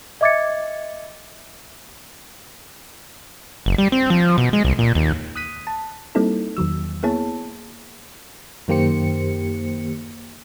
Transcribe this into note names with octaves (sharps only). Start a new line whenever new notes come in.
D#5 E5 D6 G#6 A6 C#7
F#1
G3
C4
F3
B2
G#3
C2
A#2
D#2
D#6 F#6 B6 D#7
A5
G3 A#3 C4 D#4 E4 A4
E2 D#3 F#3 E6
A#3 B3 E4 G#4 C#5 A5
F#2 D#3 A#3 G4 C5 C#7